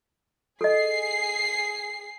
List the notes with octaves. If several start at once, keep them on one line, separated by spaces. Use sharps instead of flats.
G#4 A4 D#5 C7